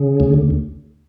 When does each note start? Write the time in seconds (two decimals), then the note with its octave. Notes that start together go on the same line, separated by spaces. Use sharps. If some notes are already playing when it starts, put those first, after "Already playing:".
Already playing: C#3
0.20 D2